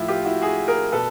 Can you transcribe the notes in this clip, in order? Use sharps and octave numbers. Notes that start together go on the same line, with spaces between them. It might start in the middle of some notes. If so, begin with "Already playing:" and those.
Already playing: A2 F3 E4
F4 G4
E4 F#4
F#4 G#4
G#4 A#4
B2 A4 B4